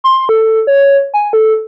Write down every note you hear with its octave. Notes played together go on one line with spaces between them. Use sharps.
C6
A4
C#5
G#5
A4